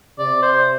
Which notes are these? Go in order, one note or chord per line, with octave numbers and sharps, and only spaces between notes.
C3 D5
C5